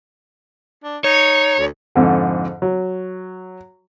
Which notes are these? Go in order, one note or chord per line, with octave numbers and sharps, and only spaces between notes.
D4
D#4 C#5
D2
F2 G#2 D3
F#3